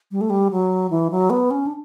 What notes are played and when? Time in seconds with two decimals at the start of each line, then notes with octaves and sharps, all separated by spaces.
0.11 G3
0.21 A3
0.30 G3
0.51 F#3
0.90 E3
1.11 F#3
1.30 B3
1.51 C#4
1.66 D4